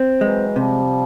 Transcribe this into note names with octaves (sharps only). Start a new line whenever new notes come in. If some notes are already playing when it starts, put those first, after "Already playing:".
Already playing: C4
E3 F#3 G#3
C3 F3 G3